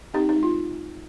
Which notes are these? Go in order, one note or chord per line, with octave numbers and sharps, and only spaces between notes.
C4 D#4 G4
D#4
G#3
F4